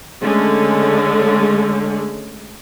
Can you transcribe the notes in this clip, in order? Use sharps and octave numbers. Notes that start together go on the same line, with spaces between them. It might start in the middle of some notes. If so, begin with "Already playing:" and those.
D3 G#3 A3 C#4